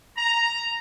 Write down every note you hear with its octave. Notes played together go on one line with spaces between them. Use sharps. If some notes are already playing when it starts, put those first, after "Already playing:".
A#5